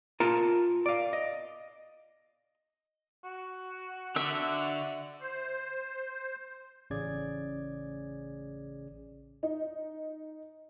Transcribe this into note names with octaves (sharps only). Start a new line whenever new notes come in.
F4 A#4 A5 A#5
D5 F5
D#5
F#4
D3 E5
C5
A1 C#3 C#4 G#4 D5 G#6
D#4